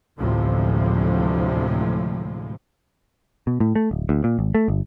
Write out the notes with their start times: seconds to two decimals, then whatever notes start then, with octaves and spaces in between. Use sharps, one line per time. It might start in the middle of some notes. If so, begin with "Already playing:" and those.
0.18 A1 D2 A2 C3 F3 G#3
3.47 B2
3.60 A2
3.75 A3
3.91 D1
4.09 D2
4.24 A#2
4.39 G#1
4.55 A3
4.68 G1